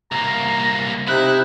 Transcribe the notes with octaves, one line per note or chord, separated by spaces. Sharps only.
C2 A#3 A#5
C3 D#4 E4 F#6